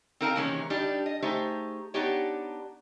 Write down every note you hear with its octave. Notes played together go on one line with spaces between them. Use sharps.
C4 D#4 A#4 F5 G#5 A5
C3 D#3 E3 G#3 A#3 C#4
G3 D4 D#4 G4
D#5
A3 D#4 G4 G#4 C5
B3 D4 D#4 G4 C#5